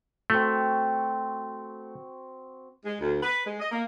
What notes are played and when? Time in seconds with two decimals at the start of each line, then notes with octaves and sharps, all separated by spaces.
0.30 A3 C4 F#4
2.86 G#3
3.01 D2
3.22 B4
3.46 G#3
3.60 D#5
3.71 A#3